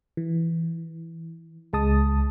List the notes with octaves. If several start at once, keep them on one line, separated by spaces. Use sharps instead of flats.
E3
C#2 G#3 A5 D#6